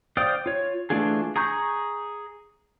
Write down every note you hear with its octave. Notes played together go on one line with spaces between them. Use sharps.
C5 D5 F5 G5 D#6
F4 C#5
E3 A3 D4 F4 G#4
G#4 A#5 C#6 G6